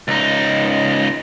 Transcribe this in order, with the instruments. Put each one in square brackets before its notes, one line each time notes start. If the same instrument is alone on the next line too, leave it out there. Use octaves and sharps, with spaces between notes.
[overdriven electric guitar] C#2 D#4